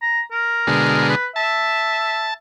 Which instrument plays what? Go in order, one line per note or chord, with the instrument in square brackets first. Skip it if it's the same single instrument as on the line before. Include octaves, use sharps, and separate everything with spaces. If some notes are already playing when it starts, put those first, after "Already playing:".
[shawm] A#5
A#4
[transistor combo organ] B2 D3 G#3
[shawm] B4
[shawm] E5 [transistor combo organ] A5